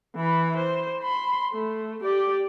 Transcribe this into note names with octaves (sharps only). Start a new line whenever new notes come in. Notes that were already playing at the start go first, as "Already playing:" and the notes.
E3 B5
C5
B5 C6
A3
G4 D5